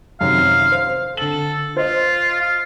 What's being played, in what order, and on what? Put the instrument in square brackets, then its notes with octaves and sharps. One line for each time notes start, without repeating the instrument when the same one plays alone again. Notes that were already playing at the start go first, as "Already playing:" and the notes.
[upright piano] F#2 C3 D#3 [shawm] F5
[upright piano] C5
[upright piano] D3 F#7 [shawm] A4
[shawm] F4 [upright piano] C5 D#5
[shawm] F5